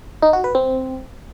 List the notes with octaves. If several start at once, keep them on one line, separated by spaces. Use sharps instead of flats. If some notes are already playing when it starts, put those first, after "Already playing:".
D#4
F#4
B4
C4